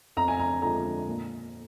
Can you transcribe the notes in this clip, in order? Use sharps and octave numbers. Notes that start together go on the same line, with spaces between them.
F2 A#5
G#5
A#5
D3 F3 G#3 A#5
A#2